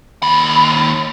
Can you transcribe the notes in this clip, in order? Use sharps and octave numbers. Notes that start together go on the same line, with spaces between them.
D#2 B5